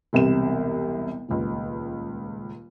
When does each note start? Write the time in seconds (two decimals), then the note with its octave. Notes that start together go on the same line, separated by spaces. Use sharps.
0.13 E1 C2 C3 E7
1.29 D#1 C#2